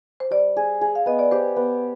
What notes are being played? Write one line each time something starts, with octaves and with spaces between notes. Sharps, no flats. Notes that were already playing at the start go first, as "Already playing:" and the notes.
C5
G3 D5
G#4
G#4
F5
B3 D#5
D5
G4 C5
B3